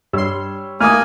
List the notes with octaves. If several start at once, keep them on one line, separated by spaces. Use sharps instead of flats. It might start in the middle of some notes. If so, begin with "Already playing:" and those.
G2 G3 C#5 C6 E6
A3 A#3 G#5 D#6 F6